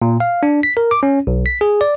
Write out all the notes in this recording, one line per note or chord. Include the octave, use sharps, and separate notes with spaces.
A#2
F5
D4
B6
A#4
D6
C#4
B1
B6
G#4
D5